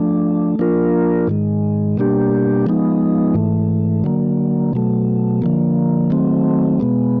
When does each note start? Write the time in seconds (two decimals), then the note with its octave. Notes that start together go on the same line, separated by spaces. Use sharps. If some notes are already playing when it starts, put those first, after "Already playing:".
Already playing: F3 A3 D4
0.59 F3 A#3 D4 F4 A#4
1.28 G#2 D#3 G#3
1.97 B2 G3 A#3 D4 G4
2.66 F3 G#3 B3 D#4
3.34 G#2 E3 A3
4.04 D3 F#3 A#3
4.73 B2 F#3 A3
5.42 D3 F3 A#3
6.10 D#3 F#3 A3 C4
6.80 B2 G#3 B3